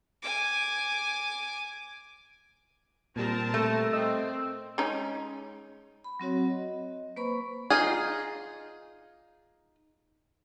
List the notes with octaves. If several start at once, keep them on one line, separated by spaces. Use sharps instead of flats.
G#5 D6
A#2 G3 C4 A#4 A5
A3
C4 D#5 E6
G#3 C#4 D#4
B5
F#3 C4 F#4 C#5
D#5
A#3 B4 C5 B5 C#6
D#4 F4 G#4